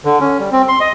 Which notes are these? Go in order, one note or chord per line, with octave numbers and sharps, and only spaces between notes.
D3
C#4
G3
C4
C6
D#5